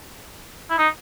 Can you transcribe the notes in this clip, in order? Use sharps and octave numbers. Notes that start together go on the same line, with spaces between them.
E4
D#4